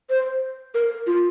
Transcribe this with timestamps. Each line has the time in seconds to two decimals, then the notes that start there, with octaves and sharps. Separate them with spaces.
0.10 C5
0.74 A#4
1.07 F4